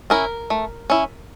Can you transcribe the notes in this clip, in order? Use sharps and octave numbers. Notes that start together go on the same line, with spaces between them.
C#4 E4 A#4
A3
C#4 E4